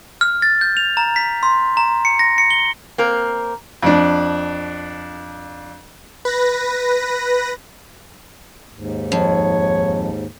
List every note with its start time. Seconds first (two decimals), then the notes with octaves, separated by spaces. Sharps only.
0.21 F6
0.42 A6
0.61 G6
0.77 F7
0.97 A#5
1.16 B6
1.43 C6
1.77 A#5
2.05 C#7
2.19 A#6
2.38 C#7
2.51 G7
2.98 A#3 C4 A#4
3.83 F2 D4
6.25 B4 A#6
8.75 D#2 G#2
9.12 F2 C#5